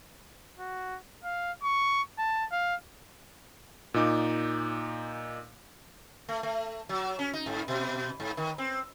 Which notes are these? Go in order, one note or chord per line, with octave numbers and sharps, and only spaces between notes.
F#4
F5
C#6
A5
F5
A#2 D#4 D6
A3
A3
F#3
C#4
D#4
G#2
B2
G#2
D#3
C4